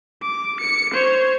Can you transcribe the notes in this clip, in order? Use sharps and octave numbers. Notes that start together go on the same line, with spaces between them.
D6
C#7
C5 C#5